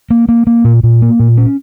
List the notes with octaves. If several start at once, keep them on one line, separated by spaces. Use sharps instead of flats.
A#3
A#3
A#3
A#2
A#2
A#3
A#2
C#4